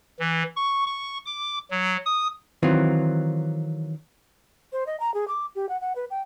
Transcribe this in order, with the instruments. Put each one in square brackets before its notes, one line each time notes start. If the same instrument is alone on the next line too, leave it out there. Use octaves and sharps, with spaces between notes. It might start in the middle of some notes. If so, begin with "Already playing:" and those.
[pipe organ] E3
C#6
C#6
D6
F#3
D#6
[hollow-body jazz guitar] D#3 E3 F#3 C4 F4
[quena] C5
D#5
A#5
G#4
D6
G4
F#5
F#5
B4
G5